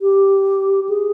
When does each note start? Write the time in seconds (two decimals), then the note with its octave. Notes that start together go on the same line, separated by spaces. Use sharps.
0.01 G4
0.89 G#4